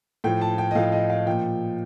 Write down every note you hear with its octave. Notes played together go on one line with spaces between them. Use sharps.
A2 F3 G5
A5
G5
D#5
A2 F3 F5
D#5
F5
A#2 F3 G5